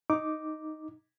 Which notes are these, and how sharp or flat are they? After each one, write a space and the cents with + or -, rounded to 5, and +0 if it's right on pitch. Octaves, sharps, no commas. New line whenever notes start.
D#4 +0 D6 +0